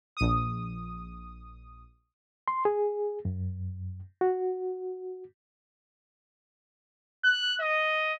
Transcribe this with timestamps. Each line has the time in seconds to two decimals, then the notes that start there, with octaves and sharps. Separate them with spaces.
0.17 A#1 D#6
2.48 C6
2.65 G#4
3.25 F#2
4.21 F#4
7.25 F#6
7.60 D#5